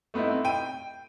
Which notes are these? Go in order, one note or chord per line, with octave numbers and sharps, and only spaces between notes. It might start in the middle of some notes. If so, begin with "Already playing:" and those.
A3 B3 C4 D#4 E4
G5 D#7